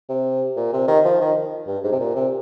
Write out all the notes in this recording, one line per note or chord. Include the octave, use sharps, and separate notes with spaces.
C3
A#2
C3
D#3
F3
D#3
G2
G#2
C3
A#2
C3